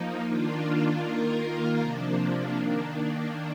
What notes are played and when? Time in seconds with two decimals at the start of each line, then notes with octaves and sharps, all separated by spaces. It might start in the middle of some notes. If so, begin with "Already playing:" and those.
Already playing: F3 A#3 D#4
0.25 D#3 A#3 D4 F4
1.02 D#3 A#3 F4 A#4
1.80 C3 F3 A#3 D4
2.57 D#3 A#3 D4